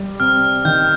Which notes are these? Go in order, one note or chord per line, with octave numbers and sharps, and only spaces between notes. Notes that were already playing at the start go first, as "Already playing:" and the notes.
Already playing: G3
C3 F6
D#3 G6